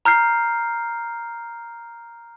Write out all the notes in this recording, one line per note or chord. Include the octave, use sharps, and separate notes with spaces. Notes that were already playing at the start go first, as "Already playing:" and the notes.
A#5 F6 G6 C7